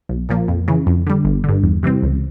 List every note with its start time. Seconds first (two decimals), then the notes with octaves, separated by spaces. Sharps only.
0.09 B1
0.29 A#2 F3 A#3
0.48 F2
0.68 C#3 E3
0.87 F2
1.07 D3 G3
1.25 G1
1.44 G2 D3
1.63 E2
1.83 C3 E3 G3 C4
2.02 C#2